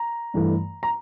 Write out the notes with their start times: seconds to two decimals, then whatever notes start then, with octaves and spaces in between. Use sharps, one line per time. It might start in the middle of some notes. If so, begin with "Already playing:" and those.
Already playing: A#5
0.34 G2 E3 A3
0.83 A#5